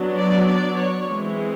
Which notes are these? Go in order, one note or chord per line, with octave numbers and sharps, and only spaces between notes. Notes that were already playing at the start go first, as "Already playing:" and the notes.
Already playing: F#3 B3 D4
D5
D5
C#5
E3 G#3 C4